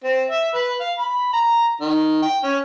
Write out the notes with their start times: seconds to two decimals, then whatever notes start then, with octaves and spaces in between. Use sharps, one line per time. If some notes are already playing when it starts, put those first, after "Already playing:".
0.04 C4
0.30 E5
0.54 B4
0.80 F5
0.98 B5
1.33 A#5
1.81 D#3
2.23 G5
2.44 C#4